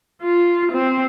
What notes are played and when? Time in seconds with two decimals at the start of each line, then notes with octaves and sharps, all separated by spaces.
0.22 F4
0.73 C4